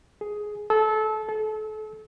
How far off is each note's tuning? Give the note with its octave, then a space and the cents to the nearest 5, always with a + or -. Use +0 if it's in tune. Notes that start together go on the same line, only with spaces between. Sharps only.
G#4 +10
A4 -25
A4 -35